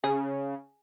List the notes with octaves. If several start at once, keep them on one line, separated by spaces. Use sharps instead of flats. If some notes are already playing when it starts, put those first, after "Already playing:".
C#3 G#4